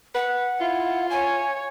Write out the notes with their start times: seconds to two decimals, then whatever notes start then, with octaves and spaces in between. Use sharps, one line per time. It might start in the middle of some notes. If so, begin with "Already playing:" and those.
0.15 B4 F#5
0.60 E4 F4
1.10 C#5 G#5